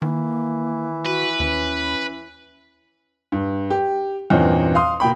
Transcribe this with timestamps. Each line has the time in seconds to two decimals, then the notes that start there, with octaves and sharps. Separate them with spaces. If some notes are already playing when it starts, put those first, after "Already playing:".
0.02 D#3 E3 A#3
1.05 F#4 B4
1.40 D#2 C#4
3.32 G2
3.70 G4
4.30 E2 G2 A#2 C4 C#4 D#4
4.75 F5 C6 D#6
5.00 B2 A#3 G5 B5